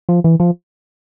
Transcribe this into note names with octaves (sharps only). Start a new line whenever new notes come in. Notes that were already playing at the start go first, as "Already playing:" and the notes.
F3
E3
F3